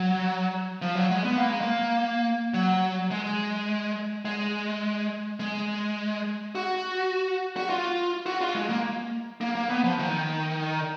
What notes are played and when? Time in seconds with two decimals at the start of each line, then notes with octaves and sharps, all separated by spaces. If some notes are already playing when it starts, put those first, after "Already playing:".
Already playing: F#3
0.82 F3
0.95 F#3
1.11 G#3
1.24 B3
1.37 A#3
1.48 G#3
1.61 A#3
2.54 F#3
3.11 G#3
4.25 G#3
5.40 G#3
6.55 F#4
7.57 F#4
7.70 F4
8.26 F#4
8.41 F4
8.55 G#3
8.69 A#3
9.41 A#3
9.55 A#3
9.69 B3
9.84 F3
9.99 D#3